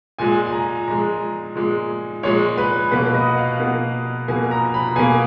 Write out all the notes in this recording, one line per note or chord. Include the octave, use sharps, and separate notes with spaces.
A#2 G#3 G#5
G#5
A#5
A#2 G#3 A#5
A#2 G#3
A#2 G#3 C#5
B4
B2 A#3 B4
D#5
F#5
F5
B2 A#3 F#5
B2 A#3 G#5
A#5
B5
B2 A#3 G#5